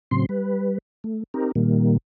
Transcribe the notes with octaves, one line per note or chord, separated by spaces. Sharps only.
A2 C#3 F#3 C4 C6
G3 B4
A3
C4 D#4 G4 A#4
A#2 D#3 G3 A#3